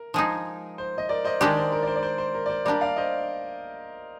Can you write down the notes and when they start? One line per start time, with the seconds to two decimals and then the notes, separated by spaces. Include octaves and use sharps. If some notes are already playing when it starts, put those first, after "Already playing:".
Already playing: A#4
0.14 F3 G#3 D#4 G#4
0.78 C5
0.98 D#5
1.09 A#4 D5
1.25 C5 D#5
1.41 D#3 G#3 D4 G4 A#4 D5
1.57 C5
1.72 A#4
1.83 D5
1.88 C5
1.96 D5
2.03 C5
2.18 C5
2.34 A#4
2.46 D5
2.50 C5
2.65 G3 A#3 D4 G4 A#4 D5
2.81 D5 F5
2.96 C5 D#5